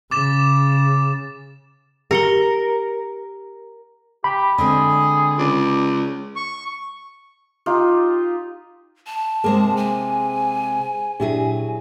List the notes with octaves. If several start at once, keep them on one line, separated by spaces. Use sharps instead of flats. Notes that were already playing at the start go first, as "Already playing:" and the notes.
C#3 D6 A6 E7
G4 A#4 C#7 G7
G4 B5
D3 G#3 C4 G#4
C#2 D5
C#6
D#4 F4 G4
A5
C3 G#3 A#3 G#4 C5
G#5
A#2 F#3 D4 E4 G4 G#4